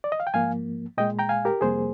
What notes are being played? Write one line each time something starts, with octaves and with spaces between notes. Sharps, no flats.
D5
D#5
F5
G5
G#2 F3 A#3 F5 G#5
A#2 G#3 D#5 G5
G5 A#5
F5 G#5
G4 A#4
F2 C3 G3 A#3 G#4 C5